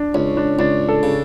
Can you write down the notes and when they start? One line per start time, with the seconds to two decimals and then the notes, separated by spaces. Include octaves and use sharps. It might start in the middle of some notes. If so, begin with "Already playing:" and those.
Already playing: D4
0.15 C#2 C#4
0.37 D4
0.59 C#2 D4
0.88 A4
1.03 C#3